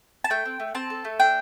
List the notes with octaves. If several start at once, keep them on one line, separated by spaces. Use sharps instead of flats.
A5
A3 G5
C4
A3
C4 A5
A4
A3
D4 G5